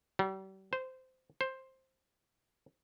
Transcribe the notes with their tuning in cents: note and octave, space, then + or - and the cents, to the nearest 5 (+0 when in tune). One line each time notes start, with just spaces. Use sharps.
G3 -40
C5 -15
C5 +10